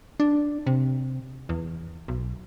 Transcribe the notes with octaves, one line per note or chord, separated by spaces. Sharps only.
D4
C3
E2
B1